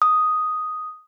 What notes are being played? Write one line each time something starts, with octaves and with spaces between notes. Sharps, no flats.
D#6